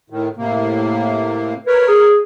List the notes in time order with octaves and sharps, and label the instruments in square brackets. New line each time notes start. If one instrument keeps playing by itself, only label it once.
[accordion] A2 D#3
A2 C3 A#3
[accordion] A#4 C#5 [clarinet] B4
[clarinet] G#4